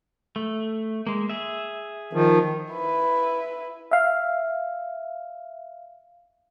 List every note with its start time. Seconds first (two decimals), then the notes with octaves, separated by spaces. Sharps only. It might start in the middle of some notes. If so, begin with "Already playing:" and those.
0.36 A3
1.07 G#3 A#3
1.29 G#4 E5
2.13 D#3 F3
2.72 E4 B4
3.91 E5 F5